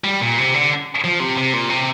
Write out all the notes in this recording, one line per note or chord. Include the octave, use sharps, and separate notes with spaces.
G3
A#2
C3
D3
F3
C3
C3
A#2
C3